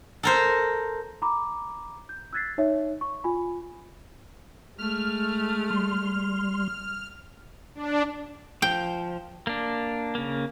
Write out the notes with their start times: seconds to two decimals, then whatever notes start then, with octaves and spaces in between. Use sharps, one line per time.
0.23 A4 A#4 C5
1.22 A#5 B5 D6
2.09 G6
2.33 E6 F#6 G#6 A6 B6 C7
2.58 D#4 C#5 E5
3.01 C#6
3.24 F4 G#5 B5
4.78 G#3 A3 F6
5.70 G3 C6
7.75 D4
8.62 F3 G5
9.47 A#3 D4
10.15 C#3 A#3